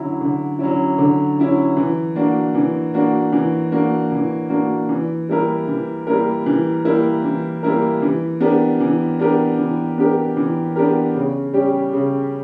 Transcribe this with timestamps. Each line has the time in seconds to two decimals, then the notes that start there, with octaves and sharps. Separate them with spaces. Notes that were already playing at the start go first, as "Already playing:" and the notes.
Already playing: D3 F#3 C#4 E4
0.21 D3
0.59 F#3 C#4 E4
0.98 D3
1.38 F#3 C#4 E4
1.77 E3
2.16 A#3 D4 F#4
2.55 E3
2.94 A#3 D4 F#4
3.32 E3
3.72 A#3 D4 F#4
4.12 E3
4.50 A#3 D4 F#4
4.89 E3
5.29 G3 A#3 E4 A#4
5.68 E3
6.07 G3 A#3 E4 A#4
6.46 E3
6.85 G3 A#3 E4 A#4
7.24 E3
7.63 G3 A#3 E4 A#4
8.02 E3
8.41 B3 D4 G4 A#4
8.80 E3
9.19 B3 D4 G4 A#4
9.58 E3
9.98 B3 D4 G4 A#4
10.37 E3
10.76 B3 D4 G4 A#4
11.15 C#3
11.53 G3 C#4 G4
11.93 C#3